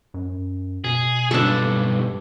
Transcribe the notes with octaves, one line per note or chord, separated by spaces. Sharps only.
F#2
B2 G#4
B1 G2 D4 A4